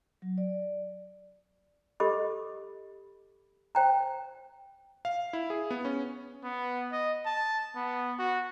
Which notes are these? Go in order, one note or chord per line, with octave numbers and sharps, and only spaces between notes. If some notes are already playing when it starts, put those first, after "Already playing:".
F#3
D5
G4 A4 D#5 B5 D6
C5 G5 A#5
F5
E4
G#4
B3
C#4
B3
D#5
A5
B3
F#4